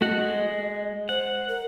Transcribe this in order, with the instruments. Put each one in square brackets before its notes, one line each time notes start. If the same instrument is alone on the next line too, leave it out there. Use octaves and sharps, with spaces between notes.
[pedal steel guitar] A3 F#4 F#5 [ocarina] D#5
[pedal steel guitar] G#3
[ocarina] C5 [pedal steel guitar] F#5
[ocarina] A#4